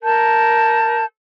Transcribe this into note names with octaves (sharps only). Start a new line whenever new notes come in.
A#4 A5 G6